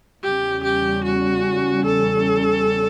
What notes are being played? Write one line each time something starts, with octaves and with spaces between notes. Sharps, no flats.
E2 C#3 G3 C#4 G4
G4
F#4
A4